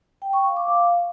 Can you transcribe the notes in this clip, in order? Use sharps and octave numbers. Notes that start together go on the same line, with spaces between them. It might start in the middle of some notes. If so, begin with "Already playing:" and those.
G5
C#6
F5
D6
F5